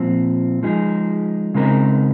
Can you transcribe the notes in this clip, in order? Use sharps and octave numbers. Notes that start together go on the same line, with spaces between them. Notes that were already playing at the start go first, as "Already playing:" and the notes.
Already playing: A#2 F3 C4
F3 G#3 D#4 G#4
C#3 G#3 C4 D#4 A#4